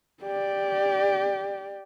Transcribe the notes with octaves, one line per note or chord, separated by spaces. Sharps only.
G4 D5